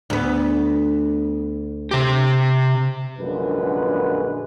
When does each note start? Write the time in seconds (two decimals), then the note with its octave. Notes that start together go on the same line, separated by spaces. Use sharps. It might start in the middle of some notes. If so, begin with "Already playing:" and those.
0.10 D2 B3
1.91 C3 G4
3.19 A#1 F#2 A#2 D3 G#3 B4